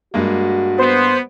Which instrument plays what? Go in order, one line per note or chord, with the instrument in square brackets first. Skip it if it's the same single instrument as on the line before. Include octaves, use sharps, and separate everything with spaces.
[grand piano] G2 G#3 A#3 [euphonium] F#4
[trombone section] B3 [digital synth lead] C5